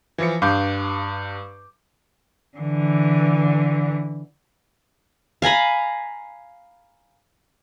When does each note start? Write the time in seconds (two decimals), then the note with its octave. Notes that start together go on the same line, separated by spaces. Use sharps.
0.18 E3 F3 C#7
0.42 G2 F5 D6 G6
2.58 D3 E3
5.42 F5 G#5 A#5 B5